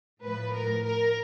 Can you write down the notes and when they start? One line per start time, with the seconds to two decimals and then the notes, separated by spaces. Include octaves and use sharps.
0.24 A2 F3 B4
0.55 A#4
0.85 A#4